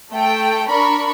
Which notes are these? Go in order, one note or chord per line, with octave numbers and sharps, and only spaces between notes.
A3 A4 G5
D4 A#4 B5 C#6